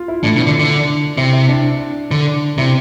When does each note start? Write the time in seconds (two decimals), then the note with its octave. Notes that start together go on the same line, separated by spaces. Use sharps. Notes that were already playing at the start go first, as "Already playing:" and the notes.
Already playing: F4
0.08 E4
0.23 A2 D4
0.36 B2
0.47 D3
0.59 D3
1.18 C3 E4
1.33 E4
1.49 D4
2.11 D3
2.58 C3 E4